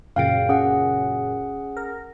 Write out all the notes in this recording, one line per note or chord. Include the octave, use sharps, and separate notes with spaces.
F#2 A#2 C#3 F5 G5 D7
C#4 G#4 F#5
A#4